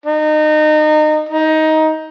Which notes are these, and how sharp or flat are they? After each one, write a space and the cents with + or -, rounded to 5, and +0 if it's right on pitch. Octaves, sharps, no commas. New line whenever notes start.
D#4 -25
D#4 +15